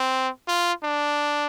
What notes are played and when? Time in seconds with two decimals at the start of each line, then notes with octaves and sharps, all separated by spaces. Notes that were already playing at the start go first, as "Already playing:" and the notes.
Already playing: C4
0.48 F4
0.84 D4